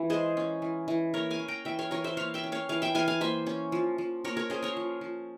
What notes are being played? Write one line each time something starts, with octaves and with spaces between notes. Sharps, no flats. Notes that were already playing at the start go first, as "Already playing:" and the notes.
Already playing: E3
G#3 G#4 C5
C#4
E3
E3
A#3 A#4 C#5
F5 G#5
C#4
G5 A#5
E3 E5 G5
C#5 F5
E3 A#4 C#5
C5 E5
A#3 C#5 F5
E5 G5
C#4
C#5 F5
E3 C#5 F5
E5 G5
E3 F5 G#5
F5 G#5
A#3 C5 E5
C#4
F3
F3
A#3 A#4 C#5
A#4 C#5
C#4 G#4 C5
A#4 C#5
F3
F3